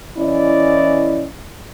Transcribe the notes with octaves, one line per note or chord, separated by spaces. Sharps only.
E3 C#4 E4 D5 D#5